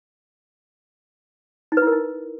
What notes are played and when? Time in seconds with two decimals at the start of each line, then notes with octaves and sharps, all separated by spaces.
1.72 D#4
1.77 B4
1.82 E4
1.87 A#4
1.92 D#4